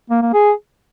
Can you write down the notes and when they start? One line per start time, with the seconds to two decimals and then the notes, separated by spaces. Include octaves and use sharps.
0.10 A#3
0.22 A#3
0.34 G#4